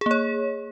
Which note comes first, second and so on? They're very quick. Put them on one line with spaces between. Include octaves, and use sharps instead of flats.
G#4 A#3 C#5